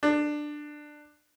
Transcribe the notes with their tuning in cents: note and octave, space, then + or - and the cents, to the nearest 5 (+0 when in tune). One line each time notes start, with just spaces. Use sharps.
D4 +15